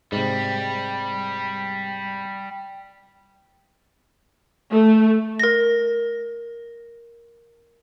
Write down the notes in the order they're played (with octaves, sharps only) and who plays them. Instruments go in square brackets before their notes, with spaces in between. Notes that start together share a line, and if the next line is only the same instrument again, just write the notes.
[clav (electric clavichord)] G#2 C3 [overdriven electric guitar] G3
[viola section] A3
[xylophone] A#4 A#6